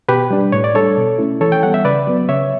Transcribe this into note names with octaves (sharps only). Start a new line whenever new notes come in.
B2 G4 B4
G3 D4
A2 C#5
D5
G3 D4 A4 C#5
B2
A3 C#4 E4
E3 A4 C#5
G5
G3 B3 F#5
E5
C#3 B4 D5
F#3 B3
C#3 C#5 E5